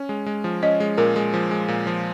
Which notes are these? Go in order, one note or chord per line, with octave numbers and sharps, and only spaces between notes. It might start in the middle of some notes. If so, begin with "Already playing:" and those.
Already playing: C#4
G#3
G#3
F3
C#4 D#5
G#3
A#2 A#4
G#3
F3
G#3
A#2
F3